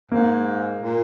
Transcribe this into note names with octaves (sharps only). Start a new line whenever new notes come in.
G#2 A#3
A#2